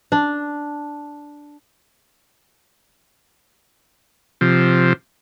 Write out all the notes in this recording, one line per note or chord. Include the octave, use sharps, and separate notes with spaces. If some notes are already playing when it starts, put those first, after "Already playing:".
D4
C3 F3